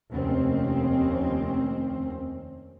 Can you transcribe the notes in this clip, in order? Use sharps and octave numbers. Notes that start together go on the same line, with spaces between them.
F1 D#2 D#3 C4 C#4